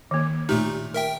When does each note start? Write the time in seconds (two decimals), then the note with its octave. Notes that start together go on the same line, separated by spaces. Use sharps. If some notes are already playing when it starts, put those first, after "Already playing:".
0.11 D#3 A#3
0.49 A#2 A3 D#4 G4
0.94 A#4 E5 G5